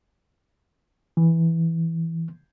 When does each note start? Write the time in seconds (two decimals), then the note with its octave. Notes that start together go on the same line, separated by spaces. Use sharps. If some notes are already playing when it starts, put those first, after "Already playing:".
1.17 E3